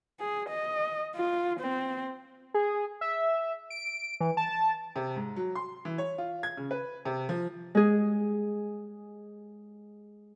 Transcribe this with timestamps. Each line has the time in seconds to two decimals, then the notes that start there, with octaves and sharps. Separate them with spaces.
0.20 G#4
0.49 D#5
1.16 F4
1.60 C4
2.54 G#4
3.01 E5
3.70 D7
4.21 E3
4.37 A5
4.96 C3
5.16 G#2
5.36 F#3
5.55 C6
5.85 E3
5.98 C#5
6.18 F4
6.43 G#6
6.57 C#3
6.71 B4
7.05 C3
7.29 F3
7.75 G#3 G#4